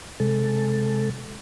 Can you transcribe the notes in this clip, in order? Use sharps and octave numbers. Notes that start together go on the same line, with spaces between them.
C3 G#3 A4